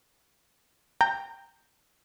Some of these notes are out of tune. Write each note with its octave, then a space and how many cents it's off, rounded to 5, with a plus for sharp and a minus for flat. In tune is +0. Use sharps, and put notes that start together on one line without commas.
G5 +15 A#5 -15